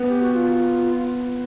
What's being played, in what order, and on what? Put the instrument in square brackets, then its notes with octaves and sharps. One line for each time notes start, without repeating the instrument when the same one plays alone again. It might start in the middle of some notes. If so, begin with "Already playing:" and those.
Already playing: [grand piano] B3
[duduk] G4
F#4
F4